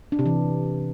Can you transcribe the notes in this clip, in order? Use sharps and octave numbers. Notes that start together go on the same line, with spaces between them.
D4
C3
E3